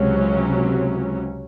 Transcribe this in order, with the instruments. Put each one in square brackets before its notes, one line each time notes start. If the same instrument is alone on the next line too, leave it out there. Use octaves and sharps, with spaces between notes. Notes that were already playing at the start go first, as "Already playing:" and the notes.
Already playing: [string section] C#2 C3 F#3 C#4 [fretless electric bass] G#3